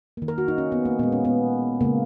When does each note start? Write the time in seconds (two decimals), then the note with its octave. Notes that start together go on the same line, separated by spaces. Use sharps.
0.17 D#3 A#3
0.28 A#4
0.38 F#4
0.48 D#4
0.58 C#4
0.72 B3
0.85 A#3
0.99 A#2 G#3 B3
1.12 C#4
1.25 B3
1.81 C#3 G#3 A#3